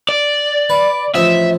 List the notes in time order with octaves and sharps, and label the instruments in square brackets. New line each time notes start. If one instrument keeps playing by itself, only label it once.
[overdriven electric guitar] D5
[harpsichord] B4
[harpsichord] A1 F3 D#5 [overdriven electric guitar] E5